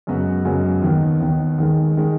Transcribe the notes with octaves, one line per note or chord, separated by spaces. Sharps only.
F#2 C#3 G#3 B3 F#4
F#2 C#3 G#3 B3 F#4
D#2 D#3 B3
D#2 D#3 B3
D#2 D#3 G#3
D#3 G#3